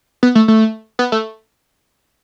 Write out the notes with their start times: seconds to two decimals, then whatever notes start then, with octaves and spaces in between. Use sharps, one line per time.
0.23 B3
0.35 A3
0.48 A3
0.99 B3
1.12 A3